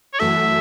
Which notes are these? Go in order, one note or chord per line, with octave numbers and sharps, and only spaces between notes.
C#5
F#2 E3 A3 F#4 A4 E5